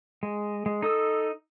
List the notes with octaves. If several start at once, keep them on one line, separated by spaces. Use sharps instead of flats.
G#3
G#3
D#4 A4 D#6 E6